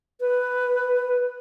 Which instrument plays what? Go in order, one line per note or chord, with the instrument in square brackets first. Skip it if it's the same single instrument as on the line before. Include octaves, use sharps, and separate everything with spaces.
[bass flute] B4